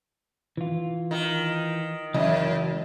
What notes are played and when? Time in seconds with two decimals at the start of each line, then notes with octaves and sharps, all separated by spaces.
0.57 E3 F4
1.11 D#3
2.14 C#2 F#2 E3 D#5